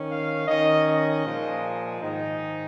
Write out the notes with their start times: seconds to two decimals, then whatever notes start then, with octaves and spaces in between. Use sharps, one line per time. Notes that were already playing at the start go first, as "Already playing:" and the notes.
Already playing: D#3 C#4
0.09 F5
0.47 D#3 C#4 D#5
0.86 D#5
1.25 A#2 F3 G#3
2.01 G#2 D#3 G#3 D#4